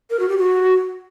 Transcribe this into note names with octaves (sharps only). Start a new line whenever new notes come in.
A#4
F#4
G4
F#4